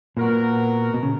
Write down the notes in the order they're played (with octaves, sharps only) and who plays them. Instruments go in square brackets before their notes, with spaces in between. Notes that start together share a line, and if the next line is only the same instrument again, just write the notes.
[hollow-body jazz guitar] A#2 [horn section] F#3 B3 F#4 A#4
[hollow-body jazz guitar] B2
C#3